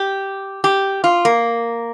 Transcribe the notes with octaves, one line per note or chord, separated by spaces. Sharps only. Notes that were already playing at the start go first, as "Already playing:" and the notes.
Already playing: G4
G4
F4
A#3